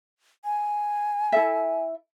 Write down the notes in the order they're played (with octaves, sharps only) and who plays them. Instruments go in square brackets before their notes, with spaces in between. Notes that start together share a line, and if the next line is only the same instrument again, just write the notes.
[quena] G#5
[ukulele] E4 A4 E5